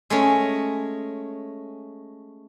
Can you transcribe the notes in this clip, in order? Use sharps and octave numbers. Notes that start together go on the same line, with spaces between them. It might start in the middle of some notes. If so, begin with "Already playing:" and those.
G#3 A3 C#4